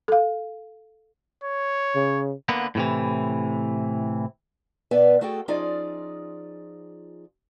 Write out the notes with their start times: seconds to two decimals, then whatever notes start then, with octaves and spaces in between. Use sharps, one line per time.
0.08 A4 F5
1.44 C#5
1.95 C#3
2.49 D3 A#3 B3
2.75 A2 C3 E3
4.91 B2 B3 B4 D5 E5 G#5
5.21 A3 F#4 G#4 A4 G5
5.48 F3 C#4 D#4 F4 G#4 D5